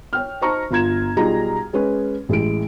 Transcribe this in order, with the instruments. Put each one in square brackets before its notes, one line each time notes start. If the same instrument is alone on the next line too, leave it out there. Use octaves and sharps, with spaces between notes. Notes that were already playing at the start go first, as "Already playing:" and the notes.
[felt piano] C#5 G5 F6
D#4 C5 A5 A#5 C#6
G1 F4 A#5 G#6 E7
B1 G3 D#4 F4 G#4 A#5
G#3 C#4 B4 C#5
A1 G#3 E4 D7